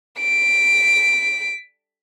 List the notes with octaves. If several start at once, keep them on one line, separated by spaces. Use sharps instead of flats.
B6 D7